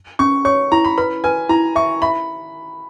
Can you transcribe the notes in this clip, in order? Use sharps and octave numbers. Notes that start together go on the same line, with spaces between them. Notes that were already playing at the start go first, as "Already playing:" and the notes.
C#4 C#6
C#5 C#6
E4 A#5
B5
B4 B5
B4 G#5
E4 A#5
E5 C#6
E5 B5